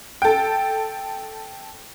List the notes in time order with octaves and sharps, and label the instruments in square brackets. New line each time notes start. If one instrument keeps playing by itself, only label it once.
[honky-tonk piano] A4 G5